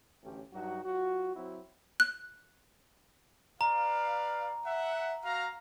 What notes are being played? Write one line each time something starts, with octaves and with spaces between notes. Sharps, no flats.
A1 D2 A3 C#4 G4
G2 F#3 D#4 F#4
F#3 F4 F#4
F#3 C4 E4 F#4
F#6
B4 D5 F5 A#5
E5 F#5
F#4 F5 A#5